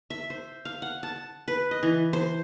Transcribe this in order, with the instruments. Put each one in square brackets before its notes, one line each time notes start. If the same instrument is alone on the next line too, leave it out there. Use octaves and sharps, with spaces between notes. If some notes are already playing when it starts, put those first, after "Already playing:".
[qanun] E5
C5
F5
F#5
A5
B4
D#5
E3
C5